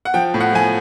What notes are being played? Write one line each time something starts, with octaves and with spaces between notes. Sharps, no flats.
F#5
F3 G5
A2
F#5
F3 G#5